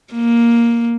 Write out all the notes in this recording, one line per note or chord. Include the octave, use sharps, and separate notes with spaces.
A#3